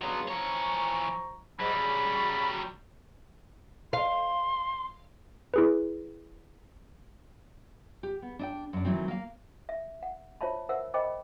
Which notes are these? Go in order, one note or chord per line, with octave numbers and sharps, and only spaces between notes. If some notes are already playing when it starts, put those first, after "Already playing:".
G2 C#3 F#3 B3 C6
E3 F3 C#5 A#5 C#6
G#2 F#3 G3 B5
C#3
F5 C6
E4 G#4 B4
G4
B3
D4 D#5 G5
F#2 D4
D#3 E3 F#3 A3 C4
A#3 F5
E5
F#5
F4 C5 C#5 E5 A5 B5
A#4 C5 E5 F#5 E6
A#4 C5 D#5 G5 B5 D6